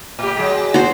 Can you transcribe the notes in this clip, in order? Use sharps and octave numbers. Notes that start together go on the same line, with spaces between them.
A2 G4
F#3 G#3
F#4 C5